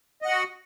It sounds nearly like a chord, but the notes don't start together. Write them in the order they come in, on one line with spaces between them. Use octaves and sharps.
D#5 F#5 F#4